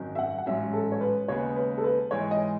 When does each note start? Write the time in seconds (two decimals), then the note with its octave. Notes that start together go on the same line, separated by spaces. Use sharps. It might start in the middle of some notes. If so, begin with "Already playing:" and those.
Already playing: G#1 F#2 D#3 F#3 C#4
0.15 E5
0.19 F#5
0.38 F#5
0.46 A1 G#2 F#3 C#4 E5
0.73 A4
0.92 C#5
1.01 B4
1.28 D#2 C#3 G#3 B3 C#5
1.56 B4
1.78 A4
1.84 B4
2.11 G#2 E3 G#3 C#5
2.31 D#5